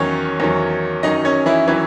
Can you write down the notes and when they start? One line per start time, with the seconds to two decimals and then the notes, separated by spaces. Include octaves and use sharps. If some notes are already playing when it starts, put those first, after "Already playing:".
Already playing: E2 D#3 F#3 C#4 C#5
0.40 E2 D#3 F#3
1.03 F#2 D#3 F#3 D#4 D#5
1.25 C#4 C#5
1.46 E3 E4
1.68 D#3 E3 F#3 E4